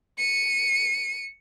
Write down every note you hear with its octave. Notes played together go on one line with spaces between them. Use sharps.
C#7 D#7